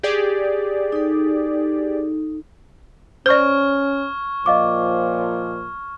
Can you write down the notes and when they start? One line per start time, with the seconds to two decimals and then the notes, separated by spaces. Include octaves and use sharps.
0.03 G4 G#4 D5
0.92 D#4 A4
3.26 C#4 C5 D5 C#6 F6 G#6
4.46 A#2 F3 D#5 F5 D6